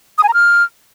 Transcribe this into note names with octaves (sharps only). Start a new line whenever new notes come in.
D#6
G#5
A#5
F6